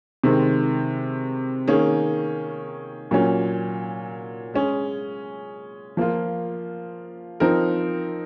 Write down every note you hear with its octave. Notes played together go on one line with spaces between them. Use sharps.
C3 D#3 G#3 C4
D#3 A#3 C#4 G#4
A#2 F#3 C#4
G#3 C#4 G#4
F3 A#3 F4
F3 C4 D#4 A#4